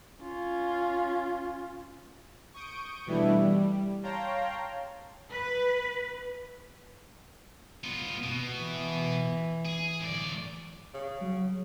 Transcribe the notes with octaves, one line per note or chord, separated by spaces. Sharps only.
C#4 F4
C#6 D#6 G6 D7
B2 E3 G3 A3 D4 E4
G3
C#5 F5 G5 A5 A#5 C6
B4
B3 F4
B2
E3
G#4
A2 D5
C#3
F#3